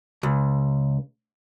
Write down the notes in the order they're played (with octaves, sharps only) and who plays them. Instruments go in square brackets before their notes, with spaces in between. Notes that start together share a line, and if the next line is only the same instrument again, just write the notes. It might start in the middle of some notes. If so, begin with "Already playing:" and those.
[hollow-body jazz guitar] C#2